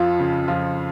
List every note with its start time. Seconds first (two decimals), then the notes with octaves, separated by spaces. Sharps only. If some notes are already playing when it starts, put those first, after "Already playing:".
Already playing: F2 F3 F4
0.20 C#3
0.48 F3 F4